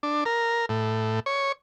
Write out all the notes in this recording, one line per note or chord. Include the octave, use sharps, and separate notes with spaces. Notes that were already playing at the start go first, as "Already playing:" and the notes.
D4
A#4
A2
C#5